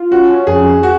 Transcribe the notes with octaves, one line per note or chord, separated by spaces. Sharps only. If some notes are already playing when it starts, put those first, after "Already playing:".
Already playing: F4
C#4 F#4
F2 G#4
F#4